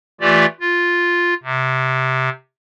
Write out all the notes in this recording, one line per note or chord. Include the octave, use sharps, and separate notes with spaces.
E3 A3 F4 G4 D5
F4
C3